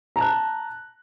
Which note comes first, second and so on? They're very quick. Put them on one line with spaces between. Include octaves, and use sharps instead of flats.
A#5 A5 F#6